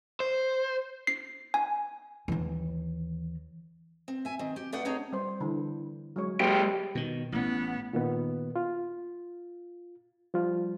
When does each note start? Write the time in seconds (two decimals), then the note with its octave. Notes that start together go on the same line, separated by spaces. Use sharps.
0.20 C5
1.07 C7
1.54 G#5
2.28 D#2 E3
4.08 C4
4.25 E5 G#5
4.39 D#3 C4
4.56 G4
4.72 A3 B3 D4 D5 F#5 G5
4.85 C4 D4 D#4 G#4 C#5
5.12 G3 C5
5.40 D3 E3
6.16 F#3 G#3 C#5
6.40 F#3 G#3 A#3 G4 C5
6.95 B2 D#3
7.32 A1 A2 B3
7.93 A#2 D#3 B3
8.56 F4
10.34 F3 G3 F4